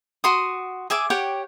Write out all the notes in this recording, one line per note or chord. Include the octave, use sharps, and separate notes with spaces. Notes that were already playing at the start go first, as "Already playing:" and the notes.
F#4 C6 D#6
G#4 E5 G#5 D6
G4 C#5 F#5 G5